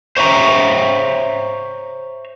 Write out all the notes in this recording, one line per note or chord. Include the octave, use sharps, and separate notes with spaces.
C5 C#5 E5 A#5